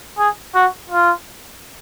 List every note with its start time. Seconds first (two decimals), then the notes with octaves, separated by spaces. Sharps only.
0.18 G#4
0.55 F#4
0.90 F4